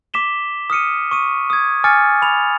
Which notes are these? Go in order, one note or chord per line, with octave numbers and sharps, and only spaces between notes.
D6 B6 E7 G7
D#6 F6 C#7 D#7
C#6 D#6 D#7
D#6 G#6
G#5 D6 F6 A6 C#7 D#7
B5 F7